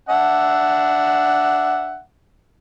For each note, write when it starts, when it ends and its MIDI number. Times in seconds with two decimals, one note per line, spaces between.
0.09 2.00 62
0.09 2.00 76
0.09 2.00 78